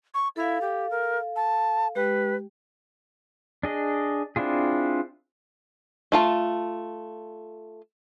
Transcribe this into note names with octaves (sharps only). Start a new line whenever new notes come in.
C#6
E4 A4 F5
G4
A#4
A5
G#3 G4 B4 G5
D4 G#4 D#5
C4 D4 E4 F4 G#4
A3 F4 A5